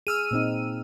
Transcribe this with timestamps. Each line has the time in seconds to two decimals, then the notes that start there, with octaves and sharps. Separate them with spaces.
0.07 G#4 E6 F6 D#7
0.31 A#2 C4 D#4